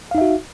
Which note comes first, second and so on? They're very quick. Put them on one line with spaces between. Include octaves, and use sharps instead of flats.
F5 D#4 E5 F#4